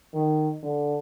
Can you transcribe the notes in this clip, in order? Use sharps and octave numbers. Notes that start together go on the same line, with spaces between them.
D#3
D3